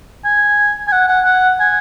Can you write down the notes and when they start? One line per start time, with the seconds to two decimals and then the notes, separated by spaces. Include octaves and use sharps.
0.25 G#5
0.88 G#5
0.92 F#5
1.08 F#5
1.25 F#5
1.60 G#5